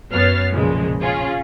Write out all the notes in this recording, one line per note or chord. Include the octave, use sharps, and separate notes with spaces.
F#2 B3 C#5 F6 A6 C7
B1 A#2 C#3 F3 G#3
C#4 F4 G#4